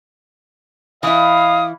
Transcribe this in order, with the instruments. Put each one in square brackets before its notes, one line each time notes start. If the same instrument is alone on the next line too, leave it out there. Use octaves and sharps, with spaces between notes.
[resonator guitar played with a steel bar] E3 E4 [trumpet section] D#5 F5 [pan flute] D#6